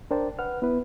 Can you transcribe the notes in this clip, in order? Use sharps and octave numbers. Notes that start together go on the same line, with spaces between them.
D4 A#4 C5 D5 G5 A5
B4 F#5 F6
B3 E4 B4